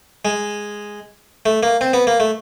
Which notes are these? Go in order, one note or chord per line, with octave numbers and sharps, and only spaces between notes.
G#3
A3
A#3
C4
B3
A#3
A3